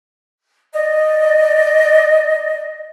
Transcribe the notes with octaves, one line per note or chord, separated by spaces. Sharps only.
D5 D#5